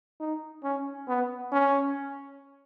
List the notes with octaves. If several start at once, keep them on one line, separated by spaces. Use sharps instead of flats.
D#4
C#4
B3
C#4